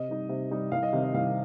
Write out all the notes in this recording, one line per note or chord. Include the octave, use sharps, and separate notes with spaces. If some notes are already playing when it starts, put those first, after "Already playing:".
Already playing: C3 D#5
G3 D#4
C3
G3 D#4
C2 F5
D#5
C3 D#3 C4 D#4
D#5
C2 F5